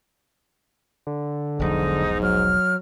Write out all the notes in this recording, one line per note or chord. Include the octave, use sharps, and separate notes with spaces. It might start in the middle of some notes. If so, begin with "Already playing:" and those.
D3
E1 B1 G#2 F3 D#4
F#3 F6